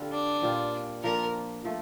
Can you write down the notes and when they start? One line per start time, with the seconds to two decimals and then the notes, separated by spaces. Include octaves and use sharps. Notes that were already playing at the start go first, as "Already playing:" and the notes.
Already playing: D3 G3 C4 F4
0.11 D4
0.42 A#2 G3 C4 F4
1.03 F3 A#3 D4 F4 A#4
1.65 F3 A3